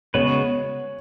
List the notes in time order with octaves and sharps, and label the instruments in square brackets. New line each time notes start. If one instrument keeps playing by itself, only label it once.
[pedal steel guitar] C#3 G#3 B3 F#4 B4 [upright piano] C#5